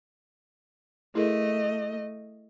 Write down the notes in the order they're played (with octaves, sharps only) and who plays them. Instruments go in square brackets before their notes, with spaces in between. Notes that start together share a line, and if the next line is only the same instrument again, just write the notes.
[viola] A3 D#5 [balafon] E4 G#4 A#4